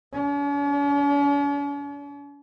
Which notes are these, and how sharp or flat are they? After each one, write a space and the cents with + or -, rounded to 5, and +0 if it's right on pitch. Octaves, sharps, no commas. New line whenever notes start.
C#4 +45